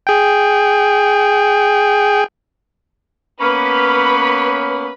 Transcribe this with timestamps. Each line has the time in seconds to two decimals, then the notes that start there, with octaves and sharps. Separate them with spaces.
0.07 G#4 G5
3.41 A#3 B3 C#4 B4 B5